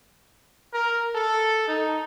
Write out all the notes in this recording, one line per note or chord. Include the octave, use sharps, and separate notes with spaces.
A#4
A4
D#4